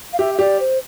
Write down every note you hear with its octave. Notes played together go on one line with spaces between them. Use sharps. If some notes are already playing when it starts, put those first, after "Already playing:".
F5
G4 E5
E5
G4 D5
C5